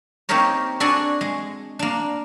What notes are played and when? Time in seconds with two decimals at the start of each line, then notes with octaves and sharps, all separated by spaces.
0.29 A#3 C4 D#4 G4 A#4 C#5
0.80 D4 F#4 A4 F#5 G#5
1.21 G#3
1.79 A#3 D4